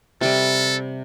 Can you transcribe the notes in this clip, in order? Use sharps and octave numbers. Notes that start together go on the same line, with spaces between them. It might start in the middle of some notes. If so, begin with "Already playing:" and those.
C3 G3 A4